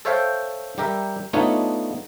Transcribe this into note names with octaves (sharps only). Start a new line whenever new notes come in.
A4 C5 C#5 E5 F5 G5
G3 G4 A#4 E5
A3 B3 D4 D#4 F4 C#5